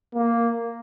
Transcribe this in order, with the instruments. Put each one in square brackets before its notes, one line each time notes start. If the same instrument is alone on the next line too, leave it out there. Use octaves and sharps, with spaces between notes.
[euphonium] A#3